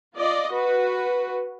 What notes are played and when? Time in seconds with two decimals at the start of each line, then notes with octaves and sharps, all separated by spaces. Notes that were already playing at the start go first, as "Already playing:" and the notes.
0.17 F4 D5 D#5
0.52 F#4 B4